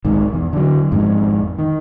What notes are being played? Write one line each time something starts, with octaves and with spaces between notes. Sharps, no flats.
B1 G#2 D#3
E2
D3 F#3
G#1 F2 G#2
D#3